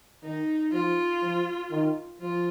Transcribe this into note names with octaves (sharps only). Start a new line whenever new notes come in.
D#3 D#4
F3 F4
F3
D#3
F3 F4